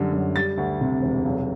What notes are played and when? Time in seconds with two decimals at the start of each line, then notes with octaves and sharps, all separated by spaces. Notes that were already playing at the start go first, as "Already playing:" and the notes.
Already playing: F#2 D3 G3
0.13 F#2
0.36 G3 A6
0.57 D2
0.81 C3
1.02 E1
1.25 B1